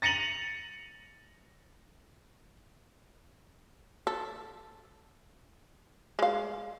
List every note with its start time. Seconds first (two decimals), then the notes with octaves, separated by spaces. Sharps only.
0.02 A6 A#6 C#7 D#7 F7 F#7
4.07 A4
6.19 G#3 F5